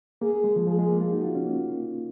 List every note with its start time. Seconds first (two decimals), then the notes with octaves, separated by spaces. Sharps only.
0.22 A#3 G#4
0.44 G#3
0.56 F3
0.67 F3 G#4
0.79 G#3
0.89 A#3
1.01 F4
1.12 D#4 F#4
1.24 F4
1.35 C#4
1.46 A#3